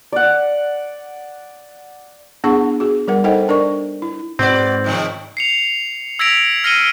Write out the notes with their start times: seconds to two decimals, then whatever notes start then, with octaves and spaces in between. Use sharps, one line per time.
0.12 D5 F#5
2.44 B3 D4 E4 G#4 F#5 C#6
2.80 F#4 G#4
3.08 G3 A#4 F#5
3.24 D#4 A4 C5 D#5 F#5 G5
3.48 D4 A#4 D5 C#6
4.02 E4
4.39 G#2 C4 F#4 B4 D5
4.84 C3 D#3 F3
5.37 C7 C#7 F7
6.19 E6 G#6 A#6 B6 D7 F7
6.64 F6 A#6 C7 C#7 D#7 G7